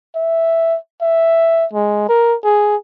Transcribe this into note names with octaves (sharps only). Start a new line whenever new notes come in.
E5
E5
G#3
A#4
G#4